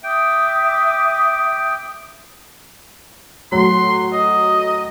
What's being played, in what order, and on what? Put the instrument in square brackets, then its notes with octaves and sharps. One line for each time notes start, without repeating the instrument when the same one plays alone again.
[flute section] E5 D6 D#6 [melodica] G5
[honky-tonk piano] A2 F#3 [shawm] C6
[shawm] D#5